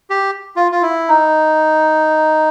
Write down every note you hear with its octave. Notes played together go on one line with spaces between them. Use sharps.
G4
F4
F4
E4
D#4